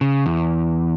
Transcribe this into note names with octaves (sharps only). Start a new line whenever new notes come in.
C#3
E2